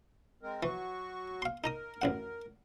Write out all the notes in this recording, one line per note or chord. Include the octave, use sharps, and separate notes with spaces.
G#3 C4 A#4
E3 F#3 F#4 C#6
F5 C6
D#4 A#4 A#5 D#6
A1 F#2 F#5